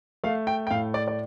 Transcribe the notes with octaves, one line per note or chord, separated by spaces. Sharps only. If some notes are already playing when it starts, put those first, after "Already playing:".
A3 F5
G5
G5
A2 F5
D5
D5